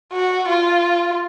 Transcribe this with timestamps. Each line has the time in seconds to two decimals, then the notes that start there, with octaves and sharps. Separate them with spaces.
0.13 F#4
0.49 F4